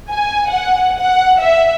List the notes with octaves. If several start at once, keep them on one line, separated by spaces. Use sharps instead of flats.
G#5
F#5
F#5
E5